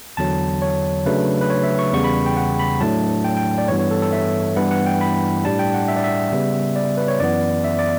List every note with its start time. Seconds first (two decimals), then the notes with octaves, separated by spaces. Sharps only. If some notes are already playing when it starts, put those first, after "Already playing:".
0.17 E2 D3 F#3 A5
0.62 C#5
1.06 C#3 F#3 A3 D4 B4
1.41 B4
1.50 C#5
1.63 E5
1.79 C#6
1.93 E2 C#3 G3 B3 C#6
2.04 B5
2.26 G5
2.37 F#5
2.59 B5
2.81 A2 F#3 A3 D4 A5
3.24 G5
3.37 G5
3.58 D5
3.68 G2 E3 G3 B3 C#5
3.79 C#5
3.91 A4
4.02 A4
4.13 E5
4.56 G2 E3 G3 B3 E4 F#5
4.71 F#5
4.86 G5
5.01 B5
5.44 A2 G3 D4 A5
5.59 G5
5.74 F#5
5.88 E5
5.96 D5
6.04 E5
6.32 C#3 G3 B3
6.76 D5
6.97 B4
7.08 C#5
7.20 F#2 E3 B3 D5
7.64 E5
7.79 D5